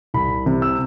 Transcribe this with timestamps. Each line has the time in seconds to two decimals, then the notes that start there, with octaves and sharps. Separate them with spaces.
0.14 C2 B5
0.46 C3
0.62 E6